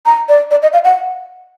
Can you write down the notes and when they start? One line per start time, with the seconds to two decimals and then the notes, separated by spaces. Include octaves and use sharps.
0.06 A#5
0.29 D5
0.51 D5
0.62 D#5
0.73 F5
0.85 F#5